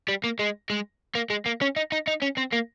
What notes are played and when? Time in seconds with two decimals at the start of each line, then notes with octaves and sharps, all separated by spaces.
0.08 G3
0.24 A#3
0.39 G#3
0.70 G#3
1.15 A#3
1.30 G#3
1.46 A#3
1.61 C#4
1.76 D#4
1.92 D#4
2.08 D#4
2.22 C#4
2.38 C4
2.53 A#3